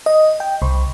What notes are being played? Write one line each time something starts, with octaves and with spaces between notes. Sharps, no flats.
D#5
G5
C2